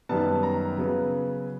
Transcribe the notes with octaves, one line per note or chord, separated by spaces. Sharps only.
F#2 D#3 G3 B3 A5
A#5
C#3 F#3 B3